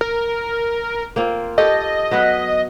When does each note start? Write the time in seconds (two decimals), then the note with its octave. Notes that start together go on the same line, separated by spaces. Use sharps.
0.01 A#4
1.16 A#3 C4 F4
1.58 G4 A4 C#5 D#5
2.11 F#3 B3 B4